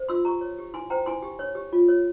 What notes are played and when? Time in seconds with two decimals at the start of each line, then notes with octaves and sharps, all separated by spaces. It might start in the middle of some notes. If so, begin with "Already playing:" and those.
Already playing: C5
0.09 F4 C6 E6
0.25 G4 A#5 C#6
0.41 C#5
0.59 G4
0.74 E4 G#5 C6
0.90 C5 G5 A#5
1.06 E4 G#5 C6
1.23 G4
1.39 C#5
1.55 G4
1.73 F4
1.88 C#5